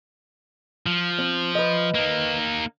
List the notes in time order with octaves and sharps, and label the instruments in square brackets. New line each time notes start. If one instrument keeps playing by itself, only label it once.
[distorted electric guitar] F3
[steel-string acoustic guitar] C4
B4 D#5
[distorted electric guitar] A#3 D#4